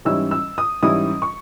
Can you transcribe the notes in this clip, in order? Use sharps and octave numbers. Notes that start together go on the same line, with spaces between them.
G#2 E3 G3 C#4 E4 E6
E6
D#6
G#2 E3 G3 C#4 E4 D#6
C#6